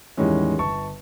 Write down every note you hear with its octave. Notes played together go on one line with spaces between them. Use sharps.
E2 A2 D#3 G3 G#3 C#4
G1 A5 C#6